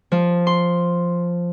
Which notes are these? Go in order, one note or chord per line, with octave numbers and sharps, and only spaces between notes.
F3
C6